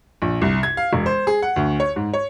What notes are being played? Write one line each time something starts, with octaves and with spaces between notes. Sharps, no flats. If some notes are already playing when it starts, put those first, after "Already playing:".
A#1
C2
G#6
F5
E1
C5
G#4
F#5
D2
C#5
G#2
C#5